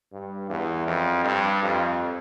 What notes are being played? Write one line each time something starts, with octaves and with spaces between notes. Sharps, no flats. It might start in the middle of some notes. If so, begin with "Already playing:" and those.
G2
E2
F2
G2
F2